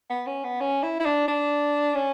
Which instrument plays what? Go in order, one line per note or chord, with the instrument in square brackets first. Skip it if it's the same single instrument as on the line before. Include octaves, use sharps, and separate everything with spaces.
[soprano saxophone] B3
C#4
B3
C#4
E4
E4
D4
D4
C#4